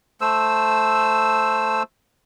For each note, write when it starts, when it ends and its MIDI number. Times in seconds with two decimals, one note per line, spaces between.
0.21 1.83 57
0.21 1.83 72
0.21 1.83 88